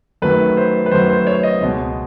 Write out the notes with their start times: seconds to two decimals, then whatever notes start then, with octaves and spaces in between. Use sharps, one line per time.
0.22 F#2 D#3 F#3 A3 B4
0.57 C5
0.86 B4
0.91 F#2 D#3 F#3 A3 C5
1.09 C5
1.27 C#5
1.43 D#5
1.61 C#2 B2 G#3